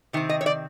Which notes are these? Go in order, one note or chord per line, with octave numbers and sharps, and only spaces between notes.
C3 D#3 C4
D#5
C#5
D5